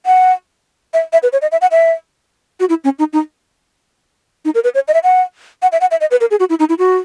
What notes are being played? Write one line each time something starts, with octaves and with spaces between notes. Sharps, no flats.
F#5
E5
E5
B4
C#5
D#5
E5
F#5
E5
F#4
E4
C#4
D#4
D#4
D#4
A#4
B4
C#5
D#5
E5
F#5
F#5
E5
F#5
E5
D#5
B4
A#4
G#4
F#4
E4
D#4
E4
F#4